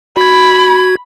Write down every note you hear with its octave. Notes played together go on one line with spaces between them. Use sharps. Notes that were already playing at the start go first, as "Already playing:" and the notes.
F#4 B5 G#6